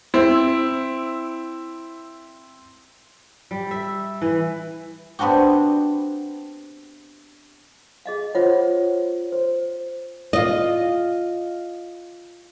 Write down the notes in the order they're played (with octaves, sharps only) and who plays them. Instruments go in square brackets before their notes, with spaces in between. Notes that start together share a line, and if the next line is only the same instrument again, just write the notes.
[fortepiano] C4 E4
[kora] G3
E5
E3
[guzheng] B3 C4 D4 F#4 G4
[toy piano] G#4 D#5 F5
[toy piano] F4 F#5 [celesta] C5 C#5
[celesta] C5
[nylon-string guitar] F4 D#5